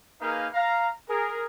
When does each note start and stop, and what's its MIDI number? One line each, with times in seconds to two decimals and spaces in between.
0.21 0.47 58
0.21 0.47 63
0.21 0.47 68
0.21 0.47 70
0.21 0.47 71
0.21 0.47 77
0.53 0.89 77
0.53 0.89 82
1.08 1.45 68
1.08 1.45 70